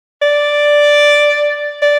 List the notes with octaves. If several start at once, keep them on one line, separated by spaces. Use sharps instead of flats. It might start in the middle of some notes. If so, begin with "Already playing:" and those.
D5
D5